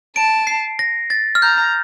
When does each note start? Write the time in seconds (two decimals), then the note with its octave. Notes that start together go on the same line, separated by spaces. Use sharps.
0.16 A5 D7
0.47 C7
0.79 A#6
1.10 A6
1.35 F6
1.42 A#5 G6